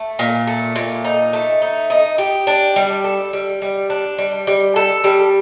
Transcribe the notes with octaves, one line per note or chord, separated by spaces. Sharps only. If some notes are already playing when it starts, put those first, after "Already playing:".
Already playing: A3
A#2
A3
A#2
D#4
A3
D#4
D#4
G4
D4
G3
A4
G3
G3
D4
G3
G3
A4
G3